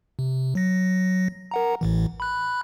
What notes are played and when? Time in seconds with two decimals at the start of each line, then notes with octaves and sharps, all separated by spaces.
0.19 C3
0.55 F#3 A#6
1.51 A#4 F#5 A#5
1.81 A1 A2 E3
2.20 B5 F#6